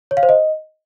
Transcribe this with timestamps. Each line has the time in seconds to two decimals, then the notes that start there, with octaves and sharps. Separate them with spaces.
0.11 C#5
0.17 F5
0.23 C5
0.29 D#5